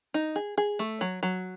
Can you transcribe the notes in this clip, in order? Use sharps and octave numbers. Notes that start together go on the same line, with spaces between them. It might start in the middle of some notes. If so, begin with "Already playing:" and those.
D#4
G#4
G#4
A3
F#3
F#3